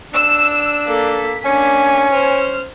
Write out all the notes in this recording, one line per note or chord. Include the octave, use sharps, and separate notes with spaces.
D4 E6
A#3 A4 B6
A#3 C#4 D4 G#5
C5 F6